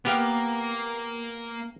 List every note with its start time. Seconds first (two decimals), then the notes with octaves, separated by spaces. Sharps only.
0.05 A#3 B3 G4 F5